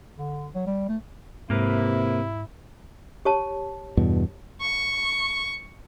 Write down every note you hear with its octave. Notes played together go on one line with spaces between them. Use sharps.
D3
F#3
G3
A3
G#2 C3 A#3 E4 A#4 B4
G4 C#5 A5
E2 G2 B2
C#6